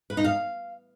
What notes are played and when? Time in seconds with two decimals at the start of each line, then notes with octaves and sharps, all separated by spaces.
0.10 B4
0.17 D#4
0.24 F5